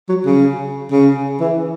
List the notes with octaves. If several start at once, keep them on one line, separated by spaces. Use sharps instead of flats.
F#3
C#3
C#3
E3